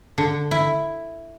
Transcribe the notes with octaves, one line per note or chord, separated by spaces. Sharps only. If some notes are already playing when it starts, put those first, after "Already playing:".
D3
E4